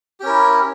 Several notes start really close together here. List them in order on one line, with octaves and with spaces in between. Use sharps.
G4 C#4 A#4 E4